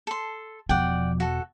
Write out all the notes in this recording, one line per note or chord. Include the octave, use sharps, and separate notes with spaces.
A4 C6
E1 B2 F3 D5 F#5 G5
F#4 A4